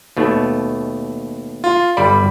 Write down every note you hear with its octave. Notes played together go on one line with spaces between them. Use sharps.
D#2 B2 A3
F4
G1 G3 D5 B5